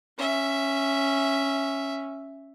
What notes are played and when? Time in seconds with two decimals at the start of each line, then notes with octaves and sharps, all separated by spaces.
0.18 C#4 E5